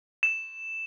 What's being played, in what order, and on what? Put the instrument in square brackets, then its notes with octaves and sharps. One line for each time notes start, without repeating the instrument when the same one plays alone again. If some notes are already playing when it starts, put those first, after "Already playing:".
[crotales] E7